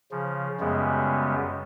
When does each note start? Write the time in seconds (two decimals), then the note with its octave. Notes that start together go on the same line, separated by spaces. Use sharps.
0.11 C#3 F3
0.60 F#2 C#3 G3 G#3 B3